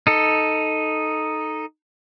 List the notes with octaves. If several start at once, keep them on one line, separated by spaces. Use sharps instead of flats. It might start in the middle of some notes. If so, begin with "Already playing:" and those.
D#4 A4